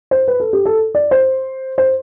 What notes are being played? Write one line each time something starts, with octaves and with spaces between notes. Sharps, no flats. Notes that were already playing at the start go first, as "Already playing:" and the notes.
C5
B4
A4
G4
A4
D5
C5
C5